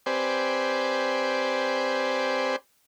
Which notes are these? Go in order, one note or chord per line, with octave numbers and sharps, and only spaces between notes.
C4 G4 B4 C5 D5 G#5